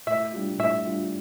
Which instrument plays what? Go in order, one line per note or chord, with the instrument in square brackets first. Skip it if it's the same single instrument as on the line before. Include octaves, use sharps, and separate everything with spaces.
[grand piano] A2 [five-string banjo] E5
[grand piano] G3 D4 F4
[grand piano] A2 [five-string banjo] E5
[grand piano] G3 D4 F4